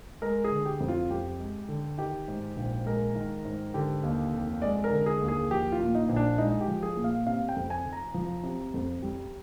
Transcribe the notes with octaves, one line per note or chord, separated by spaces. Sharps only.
G#3 A#4
G#4
D3
G4
F2
F4
F2 G4
G#3
D3
D#3 G4
G#2
A#1
G#3 A#4
D#3
G#2
D3 G4
D#2
F1
G#3 D5
A#4
D3
G#4
D#2
G#4
F3 G4
F4
A#2
D#4
A#1
D4
G#3 D#4
G4
F3
G#4
A#2
F5
C3 F5
G5
F2
G#5
F1
A#5
F3
C3
F2
G3